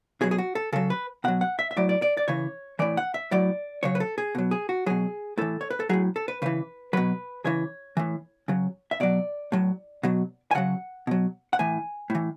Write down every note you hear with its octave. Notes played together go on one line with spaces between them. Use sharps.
B2 F#3 G#4
G#4
F#4
A4
C#3 F#3 A4
B4
B2 F#3 F#5
F#5
E5
E5
A2 F#3 D5
D5
D5
D5
C#3 E3 C#5
A2 E3 D5
F#5
E5
A2 F#3 D5
C#3 F#3 C#5
B4
A4
G#4
B2 F#3
G#4
F#4
B2 F#3 G#4
A2 E3 A4
C#5
B4
A4
A2 F#3 G#4
A4
B4
C#3 E3 B4
B2 F#3 B4
C#3 E3 C#5
A2 E3
C#3 F#3
E5
B2 F#3 D5
A2 F#3
B2 F#3
G#5
C#3 F#3 F#5
B2 F#3
F#5
A2 E3 G#5
A2 E3